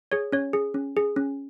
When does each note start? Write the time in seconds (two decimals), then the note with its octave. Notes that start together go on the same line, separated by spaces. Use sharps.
0.12 G#4 C#5
0.32 C#4 C#5
0.53 G#4
0.74 C#4
0.97 G#4
1.16 C#4